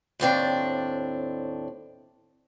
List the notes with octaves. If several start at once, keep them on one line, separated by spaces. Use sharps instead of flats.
D#2 A2 C4 D4